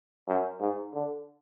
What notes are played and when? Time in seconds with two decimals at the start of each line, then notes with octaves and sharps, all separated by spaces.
0.27 F#2
0.60 G#2
0.94 D3